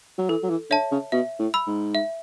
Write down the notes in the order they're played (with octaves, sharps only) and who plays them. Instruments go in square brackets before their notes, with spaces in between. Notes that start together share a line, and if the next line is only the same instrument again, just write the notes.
[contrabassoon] F#3
[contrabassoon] E3 [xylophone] A4
[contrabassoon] F#3
E3
[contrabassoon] D3 [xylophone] C#5 E5 A5
[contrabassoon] C#3
[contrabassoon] B2 [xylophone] E5
[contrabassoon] A2
[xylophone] B5 E6
[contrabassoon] G#2
[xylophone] E5